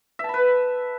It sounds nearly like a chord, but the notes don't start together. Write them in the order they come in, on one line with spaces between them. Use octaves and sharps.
E5 A5 B5 B4